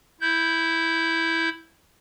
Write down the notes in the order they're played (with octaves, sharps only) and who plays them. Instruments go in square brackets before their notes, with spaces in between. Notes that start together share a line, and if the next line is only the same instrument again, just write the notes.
[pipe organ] E4 G6